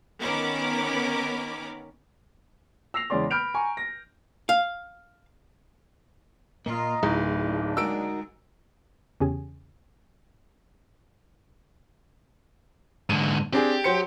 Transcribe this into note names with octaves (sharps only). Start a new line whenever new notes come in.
D#3 B3 C#4 A#4 B5 D6
E6 A#6 C7 F7
E2 C#3 G#3 C#4 D5 C6
B5 F6 G6 D7 F7
G#5 A#5 C#6
A#6
F5
A#2 A#3 F4 D#5 A#5
D1 D2 D#4 E4 G#4
C#3 A#3 D4
G#3 D#4 F#4 A#4 E6 D7
E2 C#3 C#4 G4 G#4 G#5
G#2 D3 D#7
C4 D4 G4 G#4
F#3 C5 C#7